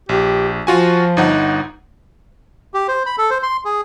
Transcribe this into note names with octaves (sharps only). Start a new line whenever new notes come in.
A#1 G4
F3 F4 F#4 G#5
G1 D#4 F#5
G4
C5
B5
A4
C5
C6
G#4